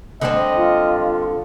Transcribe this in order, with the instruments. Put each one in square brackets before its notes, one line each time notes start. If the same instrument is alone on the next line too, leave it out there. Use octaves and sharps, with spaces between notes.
[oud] D3 G3 C4 [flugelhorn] D#5
[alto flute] F4